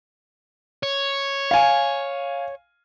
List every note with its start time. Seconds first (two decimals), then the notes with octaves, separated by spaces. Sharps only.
0.83 C#5
1.51 F5 G#5